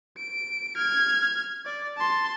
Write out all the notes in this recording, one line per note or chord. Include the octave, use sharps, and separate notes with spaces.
D7
F6 G#6
D5
A5 C6